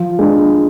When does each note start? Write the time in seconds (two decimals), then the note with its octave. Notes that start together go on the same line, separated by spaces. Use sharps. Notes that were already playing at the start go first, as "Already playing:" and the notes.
Already playing: F3
0.19 G#3 D4